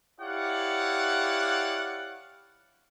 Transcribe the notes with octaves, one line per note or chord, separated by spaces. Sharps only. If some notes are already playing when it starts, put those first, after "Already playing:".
E4 G4 C#5 D5 F5 F#5